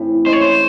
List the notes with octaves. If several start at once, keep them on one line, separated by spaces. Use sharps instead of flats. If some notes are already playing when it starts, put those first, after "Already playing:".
Already playing: A2 E3 C4
G#3 C#4 E4 C5
C#5
C5